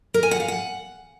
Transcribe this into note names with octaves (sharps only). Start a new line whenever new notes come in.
A#4
G#5
F#5
F5
F#5